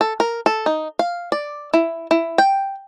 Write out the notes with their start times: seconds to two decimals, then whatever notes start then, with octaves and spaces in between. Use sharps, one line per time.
0.01 A4
0.20 A#4
0.46 A4
0.66 D#4
0.99 F5
1.32 D5
1.74 E4
2.11 E4
2.38 G5